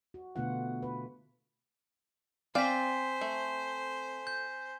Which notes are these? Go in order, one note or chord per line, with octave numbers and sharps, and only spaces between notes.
F#4
B2 D3 A3 B3 F4 F#5
B4
C4 C5 D5 F5 G#5 B6
A3
G6